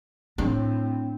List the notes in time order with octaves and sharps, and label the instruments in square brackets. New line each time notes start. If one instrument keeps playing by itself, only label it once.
[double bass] A2 [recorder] C4 [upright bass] D4